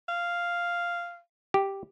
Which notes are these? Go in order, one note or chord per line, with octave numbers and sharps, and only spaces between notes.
F5
G4